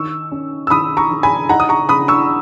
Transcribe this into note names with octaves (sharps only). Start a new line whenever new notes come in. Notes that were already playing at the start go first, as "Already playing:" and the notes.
Already playing: D#3 C#6 E6
C#4
E6
D#3 B5 D#6
A#5 C#6
D#3
G#5 B5
D#4 F#5 A#5
D#6
A#5 C#6
C#3 B5 D#6
C#6 E6